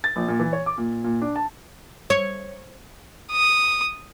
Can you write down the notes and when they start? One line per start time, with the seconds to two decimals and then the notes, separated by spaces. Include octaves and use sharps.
0.04 A6
0.16 A#1
0.28 A#2
0.40 E3
0.53 C#5
0.66 D6
0.78 A#2
1.04 A#2
1.22 D4
1.36 A5
2.10 C#5
3.32 D#6